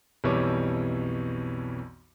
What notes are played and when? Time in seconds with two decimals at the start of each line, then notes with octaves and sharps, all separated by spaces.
0.24 B1 F2 E3 G3 C#5 D6